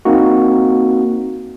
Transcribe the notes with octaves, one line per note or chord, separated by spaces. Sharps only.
A#3 C4 D#4 F#4